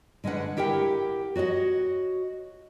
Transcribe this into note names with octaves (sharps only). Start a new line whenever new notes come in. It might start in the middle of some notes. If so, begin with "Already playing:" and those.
D3 G#3 C#4 B4 F#5
E4 G4 A#4 F#5 G5
F#4 C#5 D#5 F#5